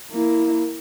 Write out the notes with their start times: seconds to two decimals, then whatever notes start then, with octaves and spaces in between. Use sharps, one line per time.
0.12 A#3 E4